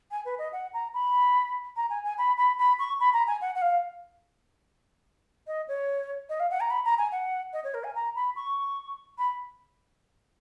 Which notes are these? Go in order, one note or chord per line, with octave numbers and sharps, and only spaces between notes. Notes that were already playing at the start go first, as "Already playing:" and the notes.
G#5
B4
D#5
F#5
A#5
B5
A#5
G#5
G#5
B5
B5
B5
C#6
B5
A#5
G#5
F#5
F#5
F5
D#5
C#5
D#5
F5
F#5
A#5
B5
A#5
G#5
F#5
D#5
C#5
A#4
G#5
A#5
B5
C#6
B5